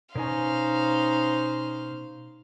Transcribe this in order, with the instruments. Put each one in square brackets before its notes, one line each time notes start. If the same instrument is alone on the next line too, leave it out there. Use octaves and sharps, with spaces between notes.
[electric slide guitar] B2 G#5 [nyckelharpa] C#4 D#4 [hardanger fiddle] C5 F5